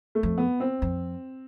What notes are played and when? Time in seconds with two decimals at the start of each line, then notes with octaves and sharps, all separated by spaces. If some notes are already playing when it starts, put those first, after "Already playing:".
0.15 A3
0.23 F2
0.38 B3
0.60 C4
0.82 F2